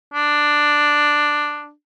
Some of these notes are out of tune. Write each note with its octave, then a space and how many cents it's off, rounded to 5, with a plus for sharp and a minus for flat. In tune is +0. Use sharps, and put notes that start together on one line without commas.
D4 +5